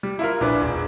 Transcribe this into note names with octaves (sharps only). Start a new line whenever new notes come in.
G3
E4 F4 A#4
A#1 D4 B4
E1